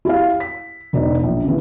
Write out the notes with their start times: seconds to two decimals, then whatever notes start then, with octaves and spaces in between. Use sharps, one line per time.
0.05 E4 G4 F5
0.40 B6
0.93 E1 D#4 D5
1.23 A#1
1.44 C#3 E3